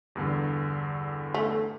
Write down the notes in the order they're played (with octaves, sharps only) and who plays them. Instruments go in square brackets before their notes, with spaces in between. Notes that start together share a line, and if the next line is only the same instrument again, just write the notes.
[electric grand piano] E2 G2 D3
[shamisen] A3